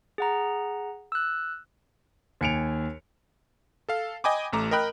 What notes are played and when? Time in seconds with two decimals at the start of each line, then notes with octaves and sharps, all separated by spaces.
0.18 G#4 F#5 A#5
1.12 E6 F#6
2.41 D#2 G#5 C#7 D7 F7
3.89 A4 F5
4.24 D#5 G5 G#5 B5 D6
4.53 A1 A3 A#5 D6
4.71 A#4 D#5 G5 B5 F#6